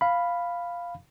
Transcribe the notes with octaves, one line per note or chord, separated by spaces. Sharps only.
F5 B5